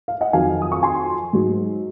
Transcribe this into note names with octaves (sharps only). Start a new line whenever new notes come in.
F5
D#5 F#5
F2 D#3 F#3 F5 G#5
D#6
C#6
G#5 C6
G#2 F#3